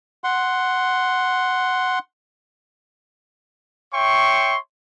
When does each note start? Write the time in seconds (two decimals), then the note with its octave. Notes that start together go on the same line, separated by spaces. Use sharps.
0.24 F#5 C6
3.93 C#5 E5 G5 C6 C#6